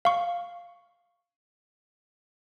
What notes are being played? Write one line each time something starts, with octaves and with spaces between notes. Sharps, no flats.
F5 C#6